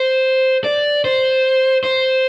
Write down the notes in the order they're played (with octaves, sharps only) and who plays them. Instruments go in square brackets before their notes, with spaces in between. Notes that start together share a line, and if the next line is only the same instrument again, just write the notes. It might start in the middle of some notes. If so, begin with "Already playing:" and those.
Already playing: [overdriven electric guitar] C5
D5
C5
C5